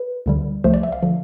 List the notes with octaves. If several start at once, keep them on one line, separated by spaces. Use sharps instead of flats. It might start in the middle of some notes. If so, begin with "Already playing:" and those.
Already playing: B4
D2 D3 G3
C2 C3 F3 A3 C5
D5
E5
F5
D3 F3